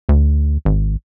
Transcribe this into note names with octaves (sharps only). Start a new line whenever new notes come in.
D2
G#1